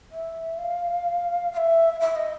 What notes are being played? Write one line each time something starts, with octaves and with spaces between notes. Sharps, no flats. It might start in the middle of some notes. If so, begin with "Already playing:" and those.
E5
F5
F5
E5
E5
D#5